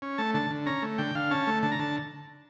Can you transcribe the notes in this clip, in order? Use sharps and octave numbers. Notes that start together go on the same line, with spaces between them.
C#4
A3 A5
D3 A5
D3
C#4 A#5
A3
D3 G5
D3 F5
C#4 A5
A3
D3 A5
A#5
D3 A5